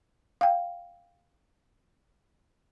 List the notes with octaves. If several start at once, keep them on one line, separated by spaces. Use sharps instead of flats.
F5 G5